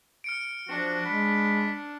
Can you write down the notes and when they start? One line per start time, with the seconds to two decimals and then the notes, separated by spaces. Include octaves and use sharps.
0.24 F6 C#7 D7
0.69 F3 D4 F#4
1.05 G#3 B5